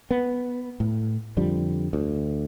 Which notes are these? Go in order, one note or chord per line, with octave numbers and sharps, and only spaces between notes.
B3
A2
F2 D3 F3 G3
D2